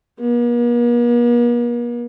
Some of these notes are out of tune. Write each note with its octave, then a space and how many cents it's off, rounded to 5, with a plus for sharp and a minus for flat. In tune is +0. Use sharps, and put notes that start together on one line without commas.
A#3 +45